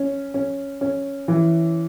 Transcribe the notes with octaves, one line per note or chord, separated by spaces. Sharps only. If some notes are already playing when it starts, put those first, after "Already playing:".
Already playing: C#4
C#4
C#4
E3